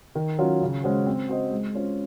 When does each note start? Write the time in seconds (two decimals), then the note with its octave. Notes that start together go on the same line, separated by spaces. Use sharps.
0.15 D#3
0.39 F#3 C#4 F4
0.62 C#3
0.83 G#3 C#4 F#4 C5
1.06 C4
1.29 F#4 C5 D#5
1.51 G#3
1.75 C#4 F4 C5